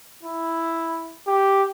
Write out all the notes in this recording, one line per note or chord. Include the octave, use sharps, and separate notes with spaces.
E4
G4